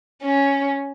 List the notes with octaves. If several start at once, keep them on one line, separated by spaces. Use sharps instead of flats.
C#4